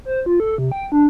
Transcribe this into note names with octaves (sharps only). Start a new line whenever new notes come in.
C5
F4
A4
C3
G5
D4